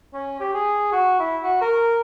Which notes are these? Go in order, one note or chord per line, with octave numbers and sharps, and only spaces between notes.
C#4
G4
G#4
F#4
E4
F#4
A#4